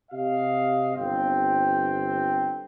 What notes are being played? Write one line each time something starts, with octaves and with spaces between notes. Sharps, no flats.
C3 G4 D#5 F5
G1 C4 G5